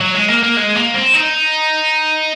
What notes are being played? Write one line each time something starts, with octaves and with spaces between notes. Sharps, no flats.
F#3
G#3
A#3
A#3
G#3
A#3
C4
D#4